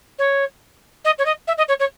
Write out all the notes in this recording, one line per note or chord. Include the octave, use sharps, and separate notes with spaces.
C#5
D#5
C#5
D#5
E5
D#5
C#5
C#5